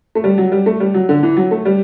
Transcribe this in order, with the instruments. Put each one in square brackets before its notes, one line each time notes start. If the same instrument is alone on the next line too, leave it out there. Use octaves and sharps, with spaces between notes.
[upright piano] A3
G3
F#3
G3
A3
G3
F#3
D3
E3
F#3
A3
G3